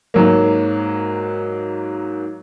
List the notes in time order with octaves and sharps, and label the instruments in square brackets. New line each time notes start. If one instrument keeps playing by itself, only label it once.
[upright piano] G#2 F#3 A#3